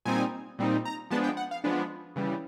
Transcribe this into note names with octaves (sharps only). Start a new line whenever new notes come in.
A#2 G3 C4 D#4 G#5
A#2 G3 C4 D#4
A#5
F3 G#3 B3 D4 A5
G5
F#5
F5
F3 G#3 B3 D4
C#3 E3 G3